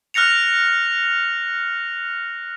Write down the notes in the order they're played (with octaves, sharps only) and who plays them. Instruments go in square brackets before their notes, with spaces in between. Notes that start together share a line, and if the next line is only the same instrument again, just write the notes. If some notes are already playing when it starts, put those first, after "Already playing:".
[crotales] F6 F#6 A#6 C#7 F7